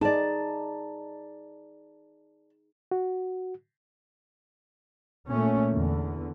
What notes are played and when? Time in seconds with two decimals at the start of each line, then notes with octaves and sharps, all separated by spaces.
0.01 D#4 G#4 D5 A5
2.91 F#4
5.27 A#2 A3 C#4
5.72 E2 D3